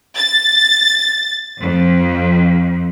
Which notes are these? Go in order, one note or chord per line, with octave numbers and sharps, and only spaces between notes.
A6
F2